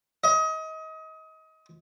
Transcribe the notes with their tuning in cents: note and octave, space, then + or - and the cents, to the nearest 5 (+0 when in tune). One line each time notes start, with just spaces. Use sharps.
D#5 +30